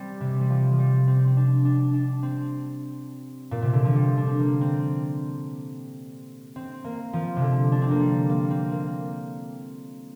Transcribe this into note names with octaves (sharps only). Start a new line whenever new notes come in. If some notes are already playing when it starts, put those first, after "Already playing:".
Already playing: G3 C4
C3
G3
F3
F3
G3
C4
C4
D4
D4
D4
C4
A#2
C3
D3
F3
G3
D4
C4
A#3
C4
C4
A#3
F3
C3
D3
D4
C4
A#3
G3
A#3
C4
A#3